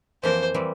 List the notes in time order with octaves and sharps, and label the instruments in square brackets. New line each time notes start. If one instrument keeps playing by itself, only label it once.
[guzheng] F2 E3 A#3 F4 A#4 [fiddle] C5
[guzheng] E3 G3 C4